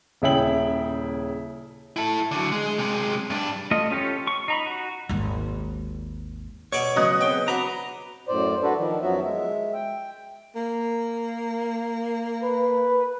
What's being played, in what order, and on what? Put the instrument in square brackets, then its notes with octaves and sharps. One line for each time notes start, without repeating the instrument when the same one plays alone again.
[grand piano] D#1 C#3 E4 G5 F#7
[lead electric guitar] E4 A4
D3 F#3
G#3
C3 G#3
G2 D4
[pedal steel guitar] A3 F4 D#5
C#4 F4 G4 A4 C#5
C#6
D#4 A#5 B5
F#4
[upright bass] G#1 D#2
[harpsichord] B2 D5 C#6 [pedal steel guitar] C#5
[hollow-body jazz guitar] C#3 F#3 B3 [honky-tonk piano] D#5 D#6 F#6
[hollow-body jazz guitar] B3 C4 G#4 [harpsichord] G5
[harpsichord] D4 [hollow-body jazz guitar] F#4 [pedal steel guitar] B4 A#5
[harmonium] F#2 A2 C5 D5
D4 F#4 A4 B4
D#3 F3
F#2 F3 F#3 B3 F#4 E5
G#3 E5
G5
[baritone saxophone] A#3
[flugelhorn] B4